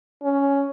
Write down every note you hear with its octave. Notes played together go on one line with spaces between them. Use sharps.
C#4